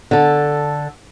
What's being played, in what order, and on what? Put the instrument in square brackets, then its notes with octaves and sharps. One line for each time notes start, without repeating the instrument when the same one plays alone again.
[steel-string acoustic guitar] D3 A4